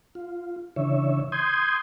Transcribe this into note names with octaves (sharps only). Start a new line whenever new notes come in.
F4
C#3 E3 D4 C#5 E5
C6 D#6 G6 G#6